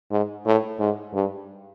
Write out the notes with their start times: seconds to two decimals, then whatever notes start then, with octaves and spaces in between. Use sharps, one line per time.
0.11 G#2
0.45 A2
0.79 G#2
1.14 G2